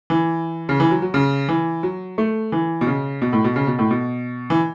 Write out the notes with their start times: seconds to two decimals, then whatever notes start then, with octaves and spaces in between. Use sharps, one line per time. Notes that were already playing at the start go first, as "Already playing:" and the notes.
0.10 E3
0.69 C#3
0.80 E3
0.91 F#3
1.02 F#3
1.14 C#3
1.49 E3
1.83 F#3
2.18 A3
2.52 E3
2.81 B2
2.87 C#3
3.22 B2
3.33 A2
3.44 B2
3.56 C#3
3.67 B2
3.79 A2
3.91 B2
4.50 E3